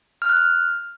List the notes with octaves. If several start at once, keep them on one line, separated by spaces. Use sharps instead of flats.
F6
F#6
F6